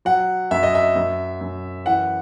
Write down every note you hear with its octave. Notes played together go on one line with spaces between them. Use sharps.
F#3 F#5
F#2 E5
D#5
E5
F#2
F#2
E3 F#5